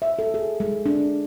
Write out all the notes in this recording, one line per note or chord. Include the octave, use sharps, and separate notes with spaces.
E5
A4
G#4
G#3
D4